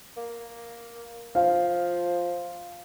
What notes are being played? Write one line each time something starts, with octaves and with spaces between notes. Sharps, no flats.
A#3
F3 F5